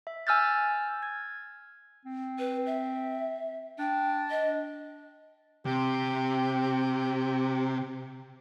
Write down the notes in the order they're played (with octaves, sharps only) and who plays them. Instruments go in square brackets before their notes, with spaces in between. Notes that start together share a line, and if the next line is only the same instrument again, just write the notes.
[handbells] E5
G#5 E6 F6 G6 A6
G#6
[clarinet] C4
[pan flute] B4
E5
[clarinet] D4 [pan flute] G5
[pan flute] D#5
[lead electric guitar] C3 [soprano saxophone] G4